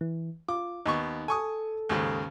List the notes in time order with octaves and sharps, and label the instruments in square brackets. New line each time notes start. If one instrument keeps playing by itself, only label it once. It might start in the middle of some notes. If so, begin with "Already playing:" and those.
[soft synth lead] E3
[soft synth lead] F4 [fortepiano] D6
[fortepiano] D#2 B3 C#6 [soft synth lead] D#4
[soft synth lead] A4 [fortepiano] G#5 C#6 D#6
[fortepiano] D#2 G#2 C#3